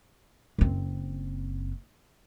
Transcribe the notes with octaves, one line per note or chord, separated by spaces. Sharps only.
F#1 C4